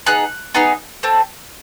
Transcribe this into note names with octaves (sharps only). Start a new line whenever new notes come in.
B3 D#4 G#4 F#6
B3 D#4 G#4
A3 C4